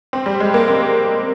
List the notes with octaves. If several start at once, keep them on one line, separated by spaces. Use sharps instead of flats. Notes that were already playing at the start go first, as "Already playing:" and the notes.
C4
G3
G#3
A#3
C4